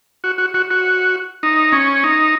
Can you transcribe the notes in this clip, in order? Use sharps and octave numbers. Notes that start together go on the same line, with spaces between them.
F#4
F#4
F#4
F#4
D#4
C#4
D#4